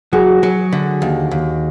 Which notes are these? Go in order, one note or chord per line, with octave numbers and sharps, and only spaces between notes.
F#3 F#4 G#4
F#3
D3
D#2
D#2